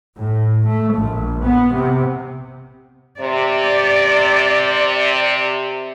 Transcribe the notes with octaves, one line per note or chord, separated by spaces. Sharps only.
A2
A3
A#1
B3
C3
C3 D5